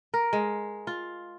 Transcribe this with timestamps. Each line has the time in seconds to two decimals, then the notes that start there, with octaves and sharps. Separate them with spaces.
0.14 A#4
0.33 G#3
0.87 F4